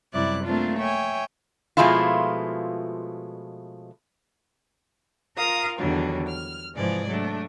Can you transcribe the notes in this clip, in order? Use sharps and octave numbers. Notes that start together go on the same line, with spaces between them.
F#2 C3 G3 E4 D5 F#6
A3 A#3 C4 D4 F4
C#5 E5 G5 G#5
B2 F3 G#3 A3 E4 F4
F4 A#4 F5 A#5 D#6
E2 D3 D#3 F#3 G3 D4
F6
G#2 C3 E3 F3 G#4 D5
F#3 A3 D4